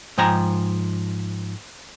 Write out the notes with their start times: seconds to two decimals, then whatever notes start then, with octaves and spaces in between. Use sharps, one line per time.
0.18 G#2 F3 G5 G#5 A#5